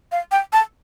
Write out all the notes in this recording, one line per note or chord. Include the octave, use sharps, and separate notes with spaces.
F5
G5
A5